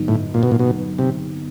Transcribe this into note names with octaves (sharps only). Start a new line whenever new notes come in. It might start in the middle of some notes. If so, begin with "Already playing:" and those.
Already playing: G2 D3 F#3 B3 D#4
A2
A#2
B2
A#2
B2
C3